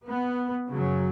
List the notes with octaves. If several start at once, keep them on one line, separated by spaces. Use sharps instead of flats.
B3
F#2 C#3 F#3